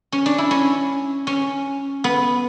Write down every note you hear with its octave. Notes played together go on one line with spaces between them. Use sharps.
C#4
D4
E4
C#4
C#4
B3